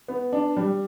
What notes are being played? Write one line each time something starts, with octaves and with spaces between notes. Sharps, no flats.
B3
D4
G3